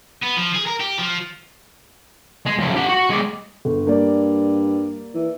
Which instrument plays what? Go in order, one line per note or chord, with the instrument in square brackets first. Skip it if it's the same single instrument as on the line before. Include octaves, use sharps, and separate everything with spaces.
[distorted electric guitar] B3
F3
G#4
A#4
G4
F3
G#3
F2 C#3
G4 F#5
F#4
G#3 D5
[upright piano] G1
[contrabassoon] G2 [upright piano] A#3 D5
[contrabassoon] E3